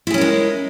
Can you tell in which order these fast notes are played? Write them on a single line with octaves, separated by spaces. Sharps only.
E4 G#4 C#4 A#4 G#3